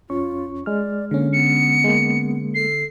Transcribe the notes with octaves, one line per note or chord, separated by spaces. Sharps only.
F2 C#4 F4 C#6
G#3 D5 F6
D3 A#3 C#4
B3 C#7
G#3 A#3
A4 C7